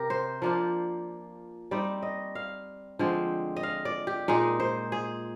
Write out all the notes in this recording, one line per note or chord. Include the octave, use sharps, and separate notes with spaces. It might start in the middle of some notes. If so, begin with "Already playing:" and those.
Already playing: C3 G4 A#4
C5
F3 A#3 D4 F4
G3 C4 D#4 D5
D#5
F5
D3 F3 G#3 C4
D#5
F5
D5
G4
A#2 G#3 D#4 G#4
C5
G#4